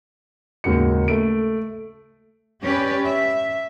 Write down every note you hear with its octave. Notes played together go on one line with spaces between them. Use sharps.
D#2 G#2 C#3 F#4 C#7
A3 D7
C#4 G4 B4 D5
E5